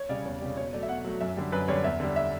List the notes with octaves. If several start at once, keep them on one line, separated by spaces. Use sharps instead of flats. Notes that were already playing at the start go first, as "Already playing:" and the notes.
Already playing: C#5
C#3 G3 D5
E2 C#5
C#3 G3
B2 C#5
F#3 A3 D5
E5
B2 F#5
F#3 A3
F#2 E5
D3 G3
F#2 B4
D3 G3 C#5
E2 E5
D3 G3
E5